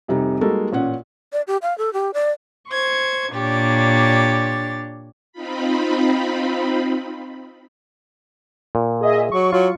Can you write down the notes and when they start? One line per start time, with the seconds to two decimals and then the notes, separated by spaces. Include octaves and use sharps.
0.08 F1 C3 G3 D#4
0.41 G3 G#3 A#3 D#4 F#4 A4
0.72 A1 A#2 C#4 F#5
1.33 D5
1.47 G4
1.62 F5
1.78 A4
1.93 G4
2.14 D5
2.70 C5 C#6 G#6
3.33 A#2 D4 G4 C#5 A6
5.33 C4 D#4 F4 B5
8.75 A#2
9.01 G#4 D#5 E5
9.32 F#3 C#6
9.52 F#3 F4